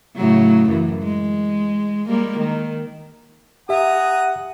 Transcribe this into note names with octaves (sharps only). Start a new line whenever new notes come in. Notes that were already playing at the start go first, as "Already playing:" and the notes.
A2 C#3 F#3
F#2 E3
G#3
G3 G#3 A#3
D#3
G4 E5 F#5 G#5 A#5 D#6